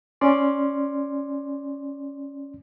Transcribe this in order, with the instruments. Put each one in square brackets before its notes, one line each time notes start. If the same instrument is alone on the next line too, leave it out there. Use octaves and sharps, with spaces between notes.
[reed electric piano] C#4 D5 C6